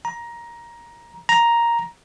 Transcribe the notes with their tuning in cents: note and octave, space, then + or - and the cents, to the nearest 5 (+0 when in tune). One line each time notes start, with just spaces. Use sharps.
A#5 +15
A#5 +5